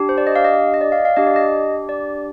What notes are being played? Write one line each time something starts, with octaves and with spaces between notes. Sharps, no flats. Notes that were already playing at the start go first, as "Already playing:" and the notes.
Already playing: D4 G4
C5
D5
D#5
F5
D#5
D#5
D5
F5
F5
D4 G4 D#5
D5
D#5
D5